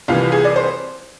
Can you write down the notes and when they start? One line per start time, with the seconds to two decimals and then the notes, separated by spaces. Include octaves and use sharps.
0.08 C2 C3 E3 F4
0.32 G#4
0.45 D5
0.56 C5